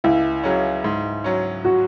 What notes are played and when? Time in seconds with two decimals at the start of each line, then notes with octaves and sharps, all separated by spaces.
0.04 C#2 E4
0.43 C#3 F#3 C#4
0.84 G#2
1.24 F#3 C#4
1.65 F#4